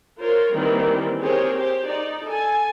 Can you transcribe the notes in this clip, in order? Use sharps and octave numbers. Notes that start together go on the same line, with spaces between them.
F4 A#4 C5 C#5
D#3 E3 G3 A#3 C4
C4 G4 G#4 A#4 C5 C#5
G4 C5
D#4 D5
A4 G#5